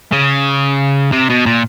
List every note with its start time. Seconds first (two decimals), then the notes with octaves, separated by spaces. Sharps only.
0.12 C#3
1.12 C3
1.30 B2
1.46 A#2